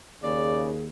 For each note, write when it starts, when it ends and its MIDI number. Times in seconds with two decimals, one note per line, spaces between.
0.23 0.90 39
0.23 0.70 49
0.23 0.84 68
0.23 0.65 74